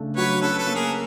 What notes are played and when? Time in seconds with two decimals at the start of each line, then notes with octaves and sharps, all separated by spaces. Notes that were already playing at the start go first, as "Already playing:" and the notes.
Already playing: C#3 A3 D4
0.17 F#3 B4 C#5
0.42 C#4 A4 B4
0.58 A4 B4
0.67 A#3
0.75 G#4 A#4